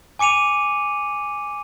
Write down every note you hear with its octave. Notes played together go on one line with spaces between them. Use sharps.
G#5 D6 C#7 D#7 F7